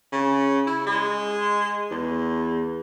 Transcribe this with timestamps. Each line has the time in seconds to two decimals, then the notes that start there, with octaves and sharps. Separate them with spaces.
0.12 C#3
0.67 E4
0.87 G#3
1.91 E2